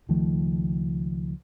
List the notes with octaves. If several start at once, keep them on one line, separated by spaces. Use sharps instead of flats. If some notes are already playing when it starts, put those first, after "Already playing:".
C#2 D#3 F3 A3